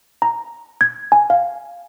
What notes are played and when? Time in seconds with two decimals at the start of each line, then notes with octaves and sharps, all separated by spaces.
0.22 A#5
0.81 G#6
1.12 G#5
1.30 F5